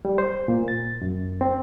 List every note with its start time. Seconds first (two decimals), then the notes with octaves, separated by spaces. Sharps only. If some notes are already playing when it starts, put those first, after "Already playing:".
0.05 G3
0.18 C5
0.48 A#2
0.68 A6
1.02 F#2
1.41 C4